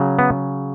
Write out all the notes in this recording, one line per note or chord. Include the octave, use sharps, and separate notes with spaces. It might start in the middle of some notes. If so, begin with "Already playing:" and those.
Already playing: C#3 F#3
B3